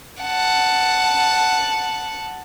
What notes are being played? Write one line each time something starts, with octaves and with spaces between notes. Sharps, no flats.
F#5 A5